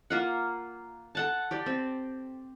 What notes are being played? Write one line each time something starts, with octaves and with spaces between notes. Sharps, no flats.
A#3 F4 F#5
A4 F#5 A5
G4 D5 G5
C4